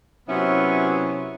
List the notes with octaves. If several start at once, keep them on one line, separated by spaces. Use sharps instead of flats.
C3 F#3 B3 C#4 E4